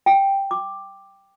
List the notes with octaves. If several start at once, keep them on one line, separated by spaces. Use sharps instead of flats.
G5
D6